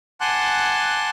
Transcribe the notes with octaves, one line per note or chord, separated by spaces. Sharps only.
F#5 G#5 A5 C6 D6 F#6